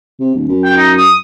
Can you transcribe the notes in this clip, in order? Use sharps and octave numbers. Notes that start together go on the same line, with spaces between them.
C3
D1
F#2
G5
D#4
D#6